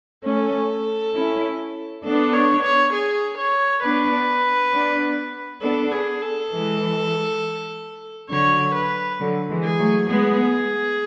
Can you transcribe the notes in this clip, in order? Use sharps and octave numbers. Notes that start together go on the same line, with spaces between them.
A3 C#4 A4
C#4 E4
B3 D4 A4
C#5
C#5
G#4
C#5
B3 D4 B4
B3 D4
B3 D4 A4
G#4
A4
E3 G#3
D3 F#3 C#5
B4
D3 F#3
E3 G#3
G#4
F#3 A3
G#3 B3 G#4